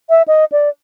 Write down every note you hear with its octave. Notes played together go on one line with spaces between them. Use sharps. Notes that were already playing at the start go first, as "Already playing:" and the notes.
E5
D#5
D5